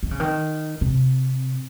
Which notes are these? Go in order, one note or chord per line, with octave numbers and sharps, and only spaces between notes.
D#3
C#3
D#3
C3